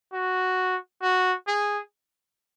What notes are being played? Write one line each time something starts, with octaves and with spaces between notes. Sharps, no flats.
F#4
F#4
G#4